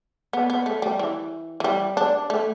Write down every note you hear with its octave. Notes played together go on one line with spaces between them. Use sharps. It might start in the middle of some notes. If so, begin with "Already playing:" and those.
B3
B3
A3
G3
E3
E3
G3
D4
A3